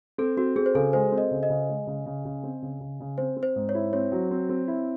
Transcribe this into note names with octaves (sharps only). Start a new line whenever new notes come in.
C4 A4
C4 F#4
C4 G#4
C5
C#3 A4
G#3 C5
C4
D#5
C#3
D#5
C#3
G#3
C#3
C#3
C#3
C4
C#3
C#3
C#3
C4 C5
C4
C5
G#2
C#5
E4
C4 C#5
F#3
C4
C4
E4